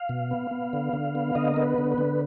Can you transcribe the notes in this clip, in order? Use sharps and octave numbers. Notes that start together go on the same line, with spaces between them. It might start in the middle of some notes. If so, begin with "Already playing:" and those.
Already playing: F5
B2
B3
B3
D3
D3
B3
D3 D#5
B3 A#4
B4
D3
B4
D3